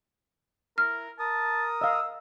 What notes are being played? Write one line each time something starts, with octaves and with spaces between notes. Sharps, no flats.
E4 A#4 F6
A#4 A5 D#6
D#5 F5 E6